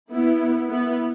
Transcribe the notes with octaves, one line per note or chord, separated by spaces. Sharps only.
B3 E4
B3 E4